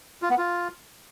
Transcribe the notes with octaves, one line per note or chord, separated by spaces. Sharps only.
F4
B3
F4